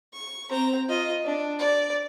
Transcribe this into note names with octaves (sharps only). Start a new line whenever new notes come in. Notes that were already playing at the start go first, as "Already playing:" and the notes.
C#6
C4 A#5
F4 D#5
D4
D5